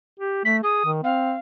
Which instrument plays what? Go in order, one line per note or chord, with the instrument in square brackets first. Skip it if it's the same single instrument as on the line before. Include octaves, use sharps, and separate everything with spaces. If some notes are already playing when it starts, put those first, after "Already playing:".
[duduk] G4
[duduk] A3 [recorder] B6
[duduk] G#4 [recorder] D#6
[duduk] D#3
[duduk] C4 [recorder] F5